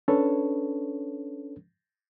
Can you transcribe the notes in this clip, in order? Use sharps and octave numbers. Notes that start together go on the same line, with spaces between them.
C#4 D4 A4 B4 C#5